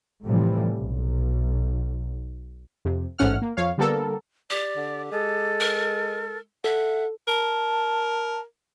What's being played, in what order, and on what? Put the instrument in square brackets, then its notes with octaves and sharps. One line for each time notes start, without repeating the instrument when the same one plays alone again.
[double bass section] A2 C3 E3 F3 G3
B1
[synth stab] F2 C3
A1 G#2 A3 C#4 F#5 F6
A#3
F2 C#5 F5
D3 G3 A#3 B3 A4 A#4
[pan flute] G4 [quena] D5
[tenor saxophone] D3
[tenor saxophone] G#3 [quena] A4
[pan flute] A#4
[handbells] A4 [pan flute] E5 [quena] F#5
[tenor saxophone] A#4 [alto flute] A5